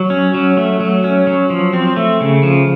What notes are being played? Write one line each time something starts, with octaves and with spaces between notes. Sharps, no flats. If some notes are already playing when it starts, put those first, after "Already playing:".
Already playing: F#3
C#4
F#3
A3
F#3
C#4
F#3
F3
C4
A3
C#3
F3